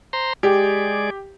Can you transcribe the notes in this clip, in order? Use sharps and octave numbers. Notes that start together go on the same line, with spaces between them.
C5 A#5 C6
G#3 G4 G#4 D5